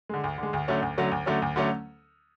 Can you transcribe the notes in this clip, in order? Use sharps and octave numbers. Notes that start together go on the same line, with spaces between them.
D3 G#3
D2
D3 G#3
D2
D3 F#3 A3 C#4
D2
D3 F#3 A3 C#4
D2
D3 F#3 A3 C#4
D2
D3 F#3 A3 C#4